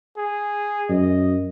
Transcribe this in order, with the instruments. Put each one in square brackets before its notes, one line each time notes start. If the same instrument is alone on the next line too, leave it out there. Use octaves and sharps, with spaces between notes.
[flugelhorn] G#4
[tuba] F#2 [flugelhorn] D#5